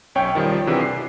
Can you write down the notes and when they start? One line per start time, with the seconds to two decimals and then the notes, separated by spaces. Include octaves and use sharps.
0.15 B1 C#4 C#5 G5
0.35 D#3 F3 G3
0.67 C3 E3 D4 F#4 G#4
0.81 C7